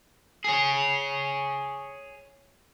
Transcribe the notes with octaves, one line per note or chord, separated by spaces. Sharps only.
G#4 C#5